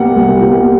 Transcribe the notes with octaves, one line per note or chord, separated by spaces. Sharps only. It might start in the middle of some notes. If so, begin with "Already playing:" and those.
Already playing: C2 B2 G3 A#3 F#5
C2
B2 G3 A#3